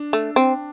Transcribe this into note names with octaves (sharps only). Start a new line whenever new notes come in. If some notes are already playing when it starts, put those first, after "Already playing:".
Already playing: D4
A3
C4